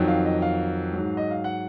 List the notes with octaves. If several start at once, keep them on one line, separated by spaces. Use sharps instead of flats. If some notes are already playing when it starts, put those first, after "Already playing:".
Already playing: F2 D#3 F#3
F5
D#5
F5
G#2 F#3
D#5
F5
F#5